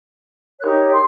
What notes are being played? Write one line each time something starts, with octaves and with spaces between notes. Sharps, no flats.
D#4 G4 A#4 C#5 F#6
C6